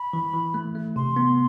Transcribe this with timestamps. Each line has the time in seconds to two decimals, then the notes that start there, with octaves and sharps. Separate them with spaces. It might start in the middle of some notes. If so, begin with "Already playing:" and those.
Already playing: B5
0.13 E3
0.34 E3
0.54 A3
0.75 A3
0.96 C3 C6
1.16 B3